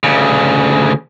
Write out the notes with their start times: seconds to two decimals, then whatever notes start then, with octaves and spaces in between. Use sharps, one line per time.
0.04 D2 C#3